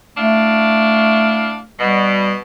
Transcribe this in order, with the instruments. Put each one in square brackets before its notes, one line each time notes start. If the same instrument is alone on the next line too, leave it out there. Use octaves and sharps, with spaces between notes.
[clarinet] A3 [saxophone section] D4 E4 F5
[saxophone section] B2 [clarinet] G3